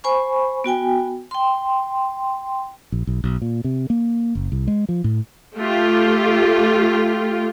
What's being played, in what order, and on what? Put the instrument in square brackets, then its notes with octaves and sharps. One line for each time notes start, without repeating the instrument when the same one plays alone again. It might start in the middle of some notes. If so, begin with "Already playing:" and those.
[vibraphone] C5 G#5 B5 C#6
B3 F#4 G5 G#5
G5 C6
[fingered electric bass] A#1
B1
B1
A#2
C3
A#3
F#1
C2
G#3
F3
A2
[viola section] A3 F4 G4